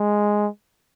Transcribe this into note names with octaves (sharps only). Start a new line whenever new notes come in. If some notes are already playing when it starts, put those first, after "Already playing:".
Already playing: G#3